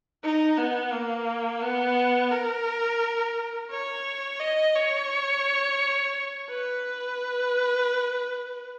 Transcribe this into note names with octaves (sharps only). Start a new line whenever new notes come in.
D#4
B3
A#3
B3
A#4
C#5
D#5
C#5
B4